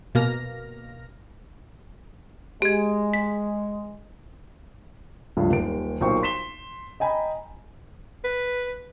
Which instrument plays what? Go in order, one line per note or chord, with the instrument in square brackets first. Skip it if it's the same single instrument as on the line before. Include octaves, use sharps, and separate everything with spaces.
[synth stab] B2 A#3 F6 A#6
[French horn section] G#3 [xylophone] G4 G#6
[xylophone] B6
[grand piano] D1 C#2 G2 F3 A3
D#1 D#2 D7
B1 A#2 A#3 C5 G5 C#6
C6 B6 E7 G7
D#5 G5 G#5 A#5 B5
[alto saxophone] B4